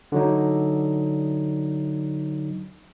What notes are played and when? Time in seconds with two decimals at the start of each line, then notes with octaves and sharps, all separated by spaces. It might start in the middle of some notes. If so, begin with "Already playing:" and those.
0.12 D3 F#3 D#4